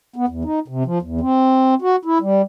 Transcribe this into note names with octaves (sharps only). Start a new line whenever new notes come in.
B3
E2
D#4
C3
F3
E2
C4
F#4
E4
G3